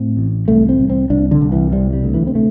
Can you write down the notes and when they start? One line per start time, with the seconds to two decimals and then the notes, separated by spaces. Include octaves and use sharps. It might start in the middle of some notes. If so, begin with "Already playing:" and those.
Already playing: A2 C4
0.17 A1
0.48 C2 A3
0.69 C4
0.79 C2
0.90 C4
1.10 C2 D4
1.31 D3
1.41 C2
1.52 E3
1.72 C3 G3
1.93 G3
2.04 D2
2.14 E3
2.27 C4
2.35 C3 A3